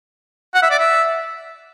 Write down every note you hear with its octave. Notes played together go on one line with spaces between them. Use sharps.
F#5
E5
D5
E5